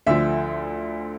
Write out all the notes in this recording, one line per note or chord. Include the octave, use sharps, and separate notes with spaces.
D2 D3 F3 E5